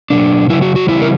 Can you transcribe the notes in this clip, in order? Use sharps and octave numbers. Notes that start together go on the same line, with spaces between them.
B2 F#3 D4
C#3 F#3 E4
F#4
F#4
C#3 E3 G3 E4
A#4